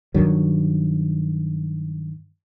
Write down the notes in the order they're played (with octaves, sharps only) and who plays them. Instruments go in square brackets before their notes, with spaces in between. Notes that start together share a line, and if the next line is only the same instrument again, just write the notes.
[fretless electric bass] G2 D#3 F#3